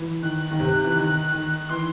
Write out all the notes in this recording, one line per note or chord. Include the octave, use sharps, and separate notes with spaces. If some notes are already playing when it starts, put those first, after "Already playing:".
Already playing: E3
D#3 F#6
D#3
C3
E3
D#3
D#3
E3 C6